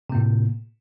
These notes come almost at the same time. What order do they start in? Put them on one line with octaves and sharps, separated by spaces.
C3 A#3 A2